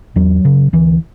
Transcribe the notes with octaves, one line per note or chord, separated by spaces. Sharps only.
E2 F#3
C#3
D2 E3